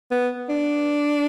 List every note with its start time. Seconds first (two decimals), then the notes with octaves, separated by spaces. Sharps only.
0.11 B3
0.49 D4